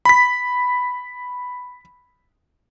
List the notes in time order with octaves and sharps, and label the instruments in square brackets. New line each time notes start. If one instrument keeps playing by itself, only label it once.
[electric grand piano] B5 B6